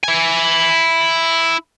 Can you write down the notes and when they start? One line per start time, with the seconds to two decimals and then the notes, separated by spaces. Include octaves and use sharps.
0.04 E4 G#5